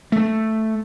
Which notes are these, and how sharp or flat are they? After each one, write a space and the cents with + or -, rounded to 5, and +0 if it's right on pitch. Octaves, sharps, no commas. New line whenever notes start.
A3 +0